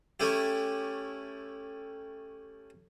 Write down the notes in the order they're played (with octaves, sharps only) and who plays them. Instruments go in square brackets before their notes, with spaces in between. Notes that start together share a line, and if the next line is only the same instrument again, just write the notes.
[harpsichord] A3 C#4 E4 G4